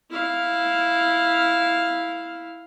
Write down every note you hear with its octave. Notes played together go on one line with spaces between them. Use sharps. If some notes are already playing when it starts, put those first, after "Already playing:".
E4 F5